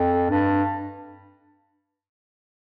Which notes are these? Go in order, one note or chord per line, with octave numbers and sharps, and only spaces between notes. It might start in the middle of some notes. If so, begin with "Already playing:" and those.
Already playing: F2
G2